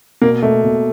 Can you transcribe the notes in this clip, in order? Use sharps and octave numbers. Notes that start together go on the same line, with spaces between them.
B2 A#3
B2 A3
B2